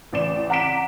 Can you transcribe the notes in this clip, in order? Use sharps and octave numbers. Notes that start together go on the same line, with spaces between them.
A1 D5 E7
F#5 A#5 D6 B6 D7 E7